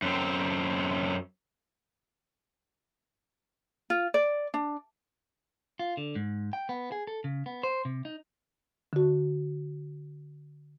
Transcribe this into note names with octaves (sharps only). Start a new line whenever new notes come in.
F#2 C4
F4
D5
D4
F4
D3
G#2
G5
B3
G#4
A4
C#3
B3
C5
C3
D#4
D3 F#4